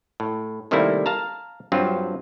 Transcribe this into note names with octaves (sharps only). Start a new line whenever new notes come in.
A2
C3 D#3 G3 A3 A#3 E4
F5 A5 A#5
G2 F#3 C4 F4